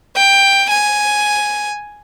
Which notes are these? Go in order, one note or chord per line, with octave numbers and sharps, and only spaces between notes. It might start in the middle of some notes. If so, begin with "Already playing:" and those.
G5
G#5